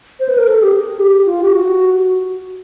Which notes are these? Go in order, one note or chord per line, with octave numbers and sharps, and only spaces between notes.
C5
B4
A#4
A4
G4
G#4
G4
F4
G4
F#4